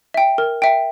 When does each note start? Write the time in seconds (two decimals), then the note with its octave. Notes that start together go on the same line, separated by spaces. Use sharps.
0.14 E5 G5
0.38 A#4
0.62 E5 G5